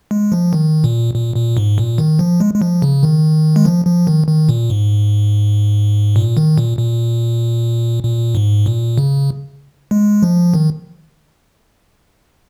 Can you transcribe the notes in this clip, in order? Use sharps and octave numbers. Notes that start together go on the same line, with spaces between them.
G#3
F3
D#3
A#2
A#2
A#2
G#2
A#2
D#3
F3
G#3
G#3
F3
C#3
D#3
G#3
F3
F3
D#3
D#3
A#2
G#2
A#2
D#3
A#2
A#2
A#2
G#2
A#2
C#3
G#3
F3
D#3